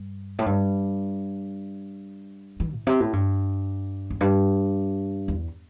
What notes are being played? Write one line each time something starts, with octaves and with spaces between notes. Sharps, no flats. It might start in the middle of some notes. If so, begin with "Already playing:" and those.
Already playing: G2
A2
G2
E3
A2
C3
A2
G2
E2
G2
E2